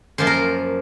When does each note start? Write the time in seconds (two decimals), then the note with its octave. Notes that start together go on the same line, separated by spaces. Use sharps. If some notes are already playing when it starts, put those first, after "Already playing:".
0.18 F#2 F3 A#3 C5
0.27 A#4